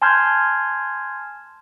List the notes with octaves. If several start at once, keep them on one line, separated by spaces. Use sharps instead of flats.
G#5 A5 C6 F6 G6 G#6